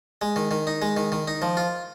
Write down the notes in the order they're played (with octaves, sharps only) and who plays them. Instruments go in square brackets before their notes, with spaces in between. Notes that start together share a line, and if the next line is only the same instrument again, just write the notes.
[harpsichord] G#3
D#3
D#3
D#4
G#3
D#3
D#3
D#4
F3
F4